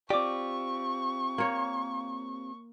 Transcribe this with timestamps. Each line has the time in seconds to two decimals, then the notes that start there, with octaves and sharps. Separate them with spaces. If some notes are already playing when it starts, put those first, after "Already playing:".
0.10 C4 F4 G4 D5 C#6 D6
1.38 A#3 C#5